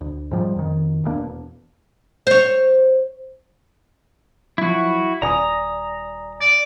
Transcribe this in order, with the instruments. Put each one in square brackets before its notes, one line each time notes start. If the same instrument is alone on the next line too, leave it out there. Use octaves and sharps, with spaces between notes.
[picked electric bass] D2
G#2 F3 G3
F2 D#3
D#1 G2 A#3 D4
E1
[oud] C5 C#5
[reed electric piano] F3 F#3 [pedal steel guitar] E4 F#4
[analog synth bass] D#1 [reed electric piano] D5 G#5 D#6 [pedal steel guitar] A#5
[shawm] D5